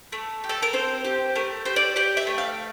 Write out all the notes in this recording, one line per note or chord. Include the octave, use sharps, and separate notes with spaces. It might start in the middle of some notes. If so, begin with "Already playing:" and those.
A3
G4
A4
A#4
C4 C5
G4
A3 A#4
G4 C5
D5
G4 D5
E5
A3
F5